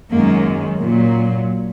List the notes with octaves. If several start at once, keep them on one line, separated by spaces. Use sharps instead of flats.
F#2 D#3 G#3 A#3
A#2 F#3